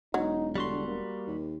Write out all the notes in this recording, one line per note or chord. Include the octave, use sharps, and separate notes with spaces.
E1 F#3 D#4
D3 G3 F#4 C6
A#3
D#2